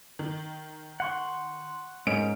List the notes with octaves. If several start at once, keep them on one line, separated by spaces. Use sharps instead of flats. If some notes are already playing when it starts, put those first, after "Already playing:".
D#3
F#5 C6 C#6
G#2 C#4 A#4 D7